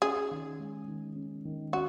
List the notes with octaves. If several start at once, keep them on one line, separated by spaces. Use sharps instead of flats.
C#4 G#4
D#3
G#3
D#3
C#4
D#3
C#4 F#4